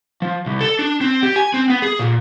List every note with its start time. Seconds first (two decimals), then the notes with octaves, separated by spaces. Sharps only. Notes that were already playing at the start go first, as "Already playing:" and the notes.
0.22 F3
0.46 C2
0.61 A4
0.79 D4
1.01 C4
1.23 G4
1.36 G#5
1.54 C4
1.70 B3
1.82 G#4
1.99 A#2